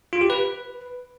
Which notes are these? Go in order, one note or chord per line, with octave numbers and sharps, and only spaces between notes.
F4
G4
B4